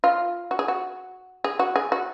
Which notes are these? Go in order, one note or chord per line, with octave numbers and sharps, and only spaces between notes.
F4
F#4
G#4
F#4
G#4
F#4
G#4
F#4